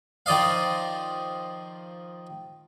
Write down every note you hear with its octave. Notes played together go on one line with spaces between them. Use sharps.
D#3 F3 D5 D#5 F5